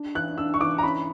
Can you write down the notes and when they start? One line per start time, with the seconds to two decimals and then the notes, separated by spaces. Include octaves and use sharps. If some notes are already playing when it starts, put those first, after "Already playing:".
Already playing: D4
0.15 E3 F#6
0.38 D4 E6
0.54 C#6
0.61 E3 D6
0.78 A#5
0.83 C#4 B5